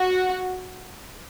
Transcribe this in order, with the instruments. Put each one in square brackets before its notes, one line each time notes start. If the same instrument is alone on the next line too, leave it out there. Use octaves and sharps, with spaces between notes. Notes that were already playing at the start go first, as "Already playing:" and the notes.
Already playing: [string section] F#4